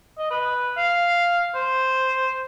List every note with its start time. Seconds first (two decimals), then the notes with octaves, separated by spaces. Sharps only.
0.18 D#5
0.31 B4
0.77 F5
1.55 C5